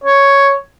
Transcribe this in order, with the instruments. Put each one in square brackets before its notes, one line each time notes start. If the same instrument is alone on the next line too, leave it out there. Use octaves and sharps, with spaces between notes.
[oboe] C#5